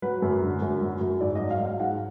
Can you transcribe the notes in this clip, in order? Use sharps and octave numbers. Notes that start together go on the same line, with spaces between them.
F#3 B4
F#2
D3
F#2
F#3
F#2
G#2 D5
D#5
F#3
F5
F#3
F5
G#2 F#5